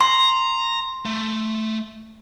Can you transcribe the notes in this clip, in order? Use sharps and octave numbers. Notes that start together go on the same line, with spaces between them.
A#5 C6
A3